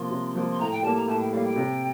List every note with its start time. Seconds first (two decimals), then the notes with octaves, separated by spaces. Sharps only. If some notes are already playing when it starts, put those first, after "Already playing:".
Already playing: C3 F3 A#3 F4 C6
0.11 C3
0.36 F3 A#3 F4
0.51 C6
0.60 A2 A#5
0.72 G5
0.83 G3 A#3 A5
0.96 A#5
1.08 A2 A5
1.20 G5
1.32 G3 A#3 F5
1.45 G5
1.56 C3